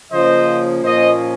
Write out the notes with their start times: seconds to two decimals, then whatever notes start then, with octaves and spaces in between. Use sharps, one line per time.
0.11 C#3 F3 A#3 C#4 C5 D#5
0.83 A#2 F3 A#3 C#4 C5 D#5